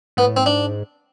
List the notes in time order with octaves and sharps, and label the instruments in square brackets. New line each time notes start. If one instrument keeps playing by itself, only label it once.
[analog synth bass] G#2 [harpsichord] B3
[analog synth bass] A2
[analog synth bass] G#2 [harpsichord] C4
[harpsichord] D4